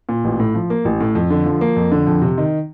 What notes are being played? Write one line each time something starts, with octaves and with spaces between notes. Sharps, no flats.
A#2
A1
A2
F3
A#3
A1
A2
F2
D3
F3
A#3
F2
D3
F2
C3
D#3